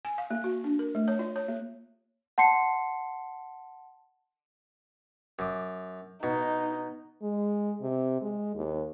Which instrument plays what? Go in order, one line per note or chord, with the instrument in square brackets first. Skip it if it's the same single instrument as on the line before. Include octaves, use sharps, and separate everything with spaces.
[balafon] G#5
F5
A#3
F#4
D4
A#4
A3
C#5
F4
C#5
A#3
[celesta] F#5 A5 C6 C7 C#7
[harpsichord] F#2 D6
[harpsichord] B2 [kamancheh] D#4
[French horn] G#3
C3
G#3
D#2